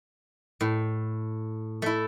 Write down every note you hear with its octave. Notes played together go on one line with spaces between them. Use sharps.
A2
A3 E4